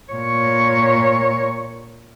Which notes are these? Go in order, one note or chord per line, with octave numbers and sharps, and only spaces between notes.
A#2 C#5